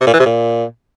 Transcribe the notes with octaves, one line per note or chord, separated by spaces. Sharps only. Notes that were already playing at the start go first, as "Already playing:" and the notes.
C3
A#2
E3
C3
A#2